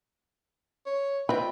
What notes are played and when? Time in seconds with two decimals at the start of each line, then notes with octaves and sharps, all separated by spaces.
0.86 C#5
1.29 C4 F4 B4 D#5 E5 G5